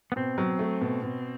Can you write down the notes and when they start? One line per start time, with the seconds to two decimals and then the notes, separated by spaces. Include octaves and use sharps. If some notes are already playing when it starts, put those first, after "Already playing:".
0.12 B3
0.16 B2 C4
0.38 F#3
0.59 A3
0.81 B2
1.03 B2